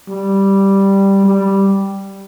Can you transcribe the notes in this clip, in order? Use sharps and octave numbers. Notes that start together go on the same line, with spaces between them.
G3
G3